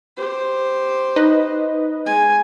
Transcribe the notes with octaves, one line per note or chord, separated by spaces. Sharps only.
G4 C5
D#4 B4 D#5
G#3 G#5